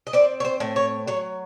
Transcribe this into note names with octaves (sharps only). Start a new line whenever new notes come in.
D#5
C4 D5
C#5
C5
A2
C#5
F#3 C#5